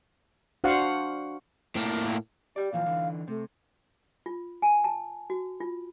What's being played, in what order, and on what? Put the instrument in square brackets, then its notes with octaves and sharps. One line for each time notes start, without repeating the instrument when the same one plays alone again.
[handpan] D4 F#4 C5 F5 F#5
[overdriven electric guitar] A2 A#3
[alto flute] G4 [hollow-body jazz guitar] D5 G5
[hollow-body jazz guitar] A#2 E3 F3 [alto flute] F5
[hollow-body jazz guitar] D3 E3
[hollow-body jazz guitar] C3 [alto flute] A3
[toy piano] F4
G#5
A5
F#4
F4